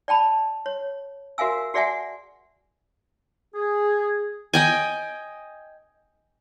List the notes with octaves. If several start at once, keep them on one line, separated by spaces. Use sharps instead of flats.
D5 G5 A5 B5
C#5
F#4 A#4 E5 F5 G#5 E6
F#4 G#4 D5 E5 F#5 G#5
G#4
D#5 G5 G#5